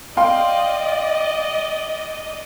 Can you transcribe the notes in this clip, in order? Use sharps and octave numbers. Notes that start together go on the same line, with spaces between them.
D5 D#5 F5 G5 C6